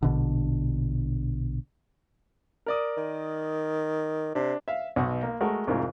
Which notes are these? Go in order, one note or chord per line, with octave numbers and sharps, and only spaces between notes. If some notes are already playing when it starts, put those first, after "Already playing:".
A#1 B2 D3
A#4 D5 D#6
D#3
C3 D4
E5 F5
B1 B2 F#5 C#6
A#3
G#3 A3 F#4 A4 A#4
C2 F2 G#2 E4 A#4